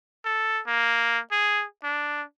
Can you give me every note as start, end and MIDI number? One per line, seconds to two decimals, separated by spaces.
0.25 0.61 69
0.67 1.19 58
1.32 1.64 68
1.84 2.22 62